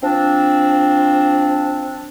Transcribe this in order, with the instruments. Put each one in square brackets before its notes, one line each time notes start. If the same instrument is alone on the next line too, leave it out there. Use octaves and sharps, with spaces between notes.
[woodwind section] F3 C4 D4